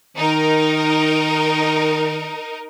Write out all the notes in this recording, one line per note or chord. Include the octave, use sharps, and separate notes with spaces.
D#3 D#4 A#4